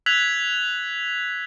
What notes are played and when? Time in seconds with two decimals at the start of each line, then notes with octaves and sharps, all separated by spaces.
0.06 E6 F#6 G#6 B6 F7 F#7